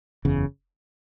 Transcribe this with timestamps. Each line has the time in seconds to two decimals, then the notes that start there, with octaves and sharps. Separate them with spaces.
0.25 F#1 E2 C#3